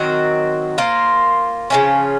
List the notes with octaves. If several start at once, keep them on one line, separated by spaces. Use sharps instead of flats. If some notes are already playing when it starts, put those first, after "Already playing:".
Already playing: D#3 F#3 C4 F#4
A#3 F4 C5
C#3 F3 A#3 C#4